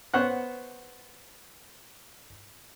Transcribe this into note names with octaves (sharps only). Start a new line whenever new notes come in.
B3 C5 C#5 F#5 F#6